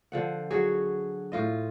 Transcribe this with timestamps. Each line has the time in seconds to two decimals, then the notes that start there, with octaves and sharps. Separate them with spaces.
0.12 D3 F3 F#5
0.51 F#3 F#4 G#4
1.32 A2 F4 D#5